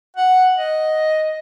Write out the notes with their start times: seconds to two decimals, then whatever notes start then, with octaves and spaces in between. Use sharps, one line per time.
0.17 F#5
0.57 D#5